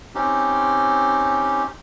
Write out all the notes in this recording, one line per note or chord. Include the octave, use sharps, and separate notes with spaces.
C4 C#4 D#4 G4